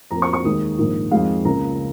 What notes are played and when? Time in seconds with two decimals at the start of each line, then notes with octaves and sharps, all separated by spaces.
0.11 F2 F3 A#3 A#5
0.22 C#6
0.33 C#6
0.45 D#2 D#3 G#3 D#6
0.78 A#1 G#2 D#3 A#3
1.11 F2 D#3 G#3 F5
1.45 C#2 C#3 A#3 A#5